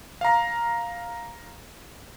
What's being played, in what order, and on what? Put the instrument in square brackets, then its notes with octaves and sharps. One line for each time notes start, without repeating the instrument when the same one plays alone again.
[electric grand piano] F5 A#5